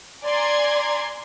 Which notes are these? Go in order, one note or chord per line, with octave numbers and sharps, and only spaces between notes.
D5 G#5 A#5 C6 G#6